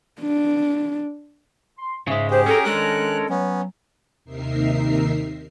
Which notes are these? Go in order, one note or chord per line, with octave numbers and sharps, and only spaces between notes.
D4
C6
G#2 C#3 G#3 E5
G4 G#4 C5
C#4 A4 A#4
D#3 G#3 D4 A4 F#6
F#3 B3 C#4
D#2 C3 D#4 A#4 E5 C7